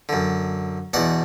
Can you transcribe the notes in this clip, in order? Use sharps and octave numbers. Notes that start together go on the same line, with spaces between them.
F#2 D3
E2 B2 D5 F#5